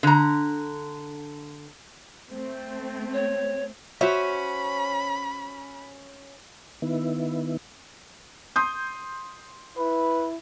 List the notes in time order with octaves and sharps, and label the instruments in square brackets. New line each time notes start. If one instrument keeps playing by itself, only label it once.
[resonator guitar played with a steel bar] D3 A#5
[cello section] A3 C4
[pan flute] C#5
[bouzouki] C#4 [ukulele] F#4 C5 E5 [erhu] B5
[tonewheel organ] D#3 B3 E4
[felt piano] C6 D#6 G6
[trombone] E4 [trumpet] B4